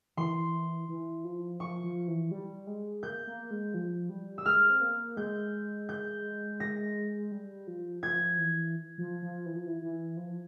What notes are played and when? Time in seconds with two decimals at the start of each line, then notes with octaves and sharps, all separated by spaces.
0.17 E3 C6
0.89 E3
1.25 F3
1.60 F3 C#6
1.84 F3
2.08 E3
2.31 G3
2.67 G#3
3.03 A#3 G6
3.27 A#3
3.51 G#3
3.74 F3
4.10 G3
4.38 E6
4.46 G#3 F6
4.70 C4
4.81 A#3
5.17 G#3 G6
5.89 G6
6.60 A#6
7.32 G3
7.67 F3
8.03 F3 G#6
8.38 E3
8.98 F3
9.22 F3
9.46 E3
9.56 F3
9.67 E3
9.82 E3
10.17 F3